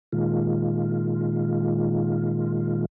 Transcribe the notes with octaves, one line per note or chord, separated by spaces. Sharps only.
A#2 D#3 G#3 F4